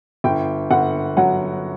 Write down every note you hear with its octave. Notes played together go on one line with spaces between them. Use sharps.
G1 G5
G1 F#5
F#3 F#5